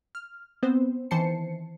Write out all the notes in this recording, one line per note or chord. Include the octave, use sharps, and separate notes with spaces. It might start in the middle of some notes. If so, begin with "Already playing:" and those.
F6
B3 C4 C5
D#3 E3 C5 A5 C7 C#7